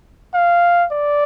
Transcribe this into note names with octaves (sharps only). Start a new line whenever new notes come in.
F5
D5